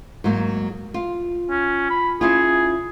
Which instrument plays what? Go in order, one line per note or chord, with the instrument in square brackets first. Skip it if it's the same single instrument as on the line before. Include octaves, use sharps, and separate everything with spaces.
[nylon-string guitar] G#2 F#3 A#3
F4
[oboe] C#4
B5
[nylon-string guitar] C#4 E4 F4 [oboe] G#4